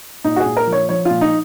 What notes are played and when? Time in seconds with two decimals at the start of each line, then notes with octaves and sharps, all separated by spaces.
0.24 A#2 D#4
0.36 F#4
0.40 G#4
0.46 A#2
0.57 A#4
0.67 F3
0.73 C#5
0.89 F3 C#5
1.05 F4
1.11 A#2
1.21 D#4